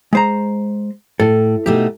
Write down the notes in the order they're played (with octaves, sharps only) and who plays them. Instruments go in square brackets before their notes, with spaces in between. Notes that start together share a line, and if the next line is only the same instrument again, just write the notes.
[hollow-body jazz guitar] G#3 C5 A#5
[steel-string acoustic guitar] A2 [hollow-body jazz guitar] A4
[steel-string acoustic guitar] B2 A3 D#4 [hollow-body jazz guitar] G4